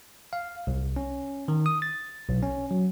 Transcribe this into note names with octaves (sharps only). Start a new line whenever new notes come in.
F5
C2
C#4
D#3
D#6
A6
B1
C#4
F#3